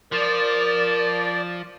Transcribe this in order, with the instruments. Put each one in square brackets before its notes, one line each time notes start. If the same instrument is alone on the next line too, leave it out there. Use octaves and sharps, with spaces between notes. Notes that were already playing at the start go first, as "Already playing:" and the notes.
[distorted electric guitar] F3 [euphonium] A#4 [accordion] D5